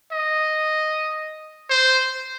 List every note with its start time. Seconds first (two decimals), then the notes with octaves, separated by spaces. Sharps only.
0.12 D#5
1.70 C5